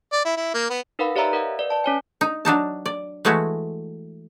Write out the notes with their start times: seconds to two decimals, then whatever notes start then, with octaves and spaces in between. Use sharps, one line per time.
0.12 D5
0.25 E4
0.37 E4
0.54 A#3
0.70 B3
0.99 D#4 A#4 B4 F5 F#5 B5
1.16 G4 C#5 D5 E5 A#5 E6
1.33 A#4 D#5 F5 F#5
1.59 B4 D5
1.70 D5 A5
1.84 C#4 C#5 G#5
2.21 D#4
2.45 F#3 D4 D#4 A5
2.86 D5
3.25 E3 G#3 A3 E4 F#4